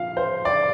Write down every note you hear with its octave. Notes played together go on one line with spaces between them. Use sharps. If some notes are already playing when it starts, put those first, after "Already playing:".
Already playing: A#2 F3 F5
C5
D5